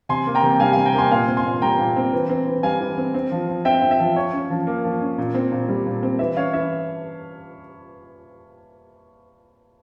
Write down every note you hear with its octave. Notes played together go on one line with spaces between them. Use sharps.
C3 G#5 C6
A#3
G5 A#5
C3
G3 F5 G#5
C3 F5 G#5
G5 A#5
A#3 G#5 C6
A#2 F5 G#5
C4
G#5 C6
A#2
G3 G5 A#5
A#2
C4
E3
C4
E3
G3 F5 G#5
E3
C4
C4
F3
F3
C4 E5 G5
C4
E5
F3
F3 C#5
C#4
F3
A#3
F3
C#4
A#2
C4
A#2
G3
A#2
C4
E3 E5
C#4 C#5 F5
E3 E5